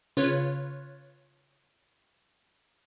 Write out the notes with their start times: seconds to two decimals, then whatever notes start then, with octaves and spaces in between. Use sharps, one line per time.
0.17 C#3 F4 B4 C#5